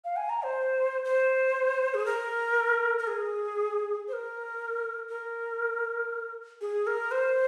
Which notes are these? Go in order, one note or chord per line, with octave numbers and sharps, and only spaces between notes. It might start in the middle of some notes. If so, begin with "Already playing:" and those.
F5
G#5
A#5
C5
C5
G#4
A#4
A#4
G#4
C5
A#4
A#4
G#4
A#4
C5